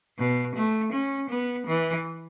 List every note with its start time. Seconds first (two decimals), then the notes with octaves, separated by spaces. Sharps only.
0.18 B2
0.55 A3
0.93 C#4
1.30 B3
1.67 E3